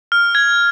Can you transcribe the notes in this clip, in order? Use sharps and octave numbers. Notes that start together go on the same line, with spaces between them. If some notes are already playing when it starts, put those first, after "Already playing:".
F6
G#6